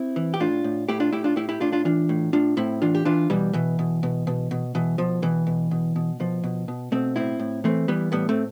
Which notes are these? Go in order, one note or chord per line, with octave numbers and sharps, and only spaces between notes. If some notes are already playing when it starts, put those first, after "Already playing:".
Already playing: C4 E4
E3
G4
A2 D4 F4
A2
A2 E4 G4
D4 F4
A2 E4 G4
D4 F4
A2 E4 G4
E4 G4
A2 D4 F4
D4 F4
E3 D4 F4
A2
A2 D4 F4
A2 C4 E4
E3 D4 F4
G4
E3 D4 F4
B2 E3 G3
B2 E3
B2
B2
B2
B2
B2 E3
B2 F3
B2 E3
B2
B2
B2
B2 F3
B2
B2
B2 A3 C4
A2 C4 E4
A2
E3 A3 C4
E3 G3 B3
A2 G3 B3
A3 C4